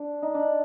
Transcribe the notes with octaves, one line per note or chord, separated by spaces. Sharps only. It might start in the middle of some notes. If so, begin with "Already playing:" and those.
Already playing: D4
D#4
D4